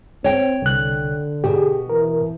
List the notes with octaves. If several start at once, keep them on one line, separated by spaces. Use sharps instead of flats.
C4 C#5 G5
C2 D3 F#6
B2 G4 G#4
E3 A#4